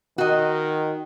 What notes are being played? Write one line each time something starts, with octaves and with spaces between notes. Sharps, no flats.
D#3 F#4 D#5